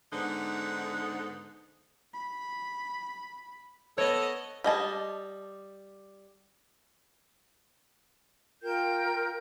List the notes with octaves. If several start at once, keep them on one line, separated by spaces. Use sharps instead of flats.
G#2 D3 B3 D#4 C5 F#5
B5
B3 A4 C#5 D#5
G3 D#5 G#5 A5
F4 A#4 G5 G6